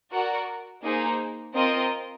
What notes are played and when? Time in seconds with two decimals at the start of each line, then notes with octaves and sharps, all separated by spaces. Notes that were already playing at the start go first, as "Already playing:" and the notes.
0.11 F#4 A#4 D5 F#5
0.82 A#3 D#4 G#4 C5
1.54 C4 F4 A#4 D#5